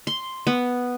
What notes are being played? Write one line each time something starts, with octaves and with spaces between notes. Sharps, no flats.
C6
B3